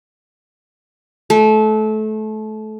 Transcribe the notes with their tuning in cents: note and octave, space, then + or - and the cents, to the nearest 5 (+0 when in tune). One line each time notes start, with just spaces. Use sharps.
A3 -25